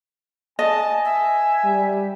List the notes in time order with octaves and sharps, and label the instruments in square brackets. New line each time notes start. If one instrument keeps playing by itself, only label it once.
[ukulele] D#5 [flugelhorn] G#5 [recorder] A5
[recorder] E5
[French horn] G3